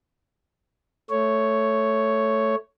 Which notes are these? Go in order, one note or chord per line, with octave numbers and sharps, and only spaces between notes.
A3 C#5